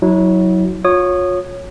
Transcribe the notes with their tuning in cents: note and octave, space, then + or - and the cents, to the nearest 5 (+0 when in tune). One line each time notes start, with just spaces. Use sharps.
F#3 +0 E4 -35
F4 +40 C#5 -5 D#6 -25